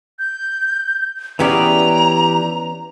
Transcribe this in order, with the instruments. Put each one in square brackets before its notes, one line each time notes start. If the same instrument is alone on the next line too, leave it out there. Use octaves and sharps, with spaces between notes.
[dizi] G6
[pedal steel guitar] E3 G4 D5 [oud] B3 C#4 G#4 [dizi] A#5